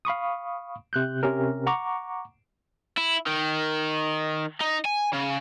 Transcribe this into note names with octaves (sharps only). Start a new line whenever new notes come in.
F5 B5 C#6 D#6
C3 F#6 G6
C3 C#4 G4 A#4
F#5 A#5 C#6 D6
E4
D#3
D#4
G#5
C#3